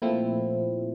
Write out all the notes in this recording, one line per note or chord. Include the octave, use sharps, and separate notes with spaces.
A#2 F3 A3 C4 E4